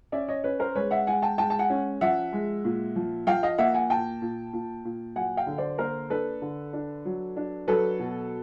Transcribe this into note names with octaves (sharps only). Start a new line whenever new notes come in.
C#4 D5 E5
C#5 D#5
C#4 B4 C#5
A#4 C5
G#3 B4 C#5
E5 F#5
G#3 F#5 G#5
G5 A5
G#3 G5 A5
A5
F#5 G#5
C#4
F3 E5 F#5
G#3
A#2
F3
F3 F5 G5
D#5 F5
A#3 E5 F#5
F#5 G#5
A#2 G5 A5
A#2
A#2
A#2
F#3 F#5 G#5
F5 G5
D3
C5 D5
A#3 A#4 C5
D4 A4 B4
D3
D4
F#3
D4
F#3 A4 B4
B2